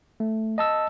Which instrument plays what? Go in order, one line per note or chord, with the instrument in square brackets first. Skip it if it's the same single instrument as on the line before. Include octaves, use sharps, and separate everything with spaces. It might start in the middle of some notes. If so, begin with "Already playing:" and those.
[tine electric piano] A3
D#5 A5 E6